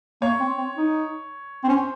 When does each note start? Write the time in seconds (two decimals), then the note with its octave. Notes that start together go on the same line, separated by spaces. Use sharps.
0.22 A#3 C#5
0.40 C4
0.58 C4
0.77 D#4
1.64 C4
1.68 C#4 C5